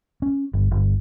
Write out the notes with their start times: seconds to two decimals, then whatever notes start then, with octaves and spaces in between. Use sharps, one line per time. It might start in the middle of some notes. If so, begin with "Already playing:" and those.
0.22 C#4
0.54 G1
0.71 G1